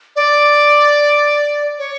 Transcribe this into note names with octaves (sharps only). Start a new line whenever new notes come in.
D5
C#5